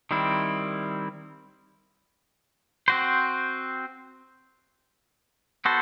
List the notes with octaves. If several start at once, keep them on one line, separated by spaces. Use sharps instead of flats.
D#3 G3 C4 E4
C4 F#4 C5
B3 F#4 A4 C5